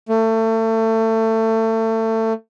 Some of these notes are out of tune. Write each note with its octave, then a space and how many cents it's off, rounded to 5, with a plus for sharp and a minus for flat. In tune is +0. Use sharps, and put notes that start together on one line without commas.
A3 +30